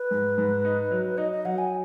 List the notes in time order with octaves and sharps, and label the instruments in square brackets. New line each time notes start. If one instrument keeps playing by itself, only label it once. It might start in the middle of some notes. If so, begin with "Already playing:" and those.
Already playing: [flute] B4
[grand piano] G#2
G#2
D#4
F#3
[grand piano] D#4 [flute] D#5
[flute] D#5
[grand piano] F#3 [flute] F#5
[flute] G#5